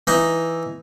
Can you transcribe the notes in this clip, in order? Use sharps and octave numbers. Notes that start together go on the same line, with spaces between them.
E3 D#4 E4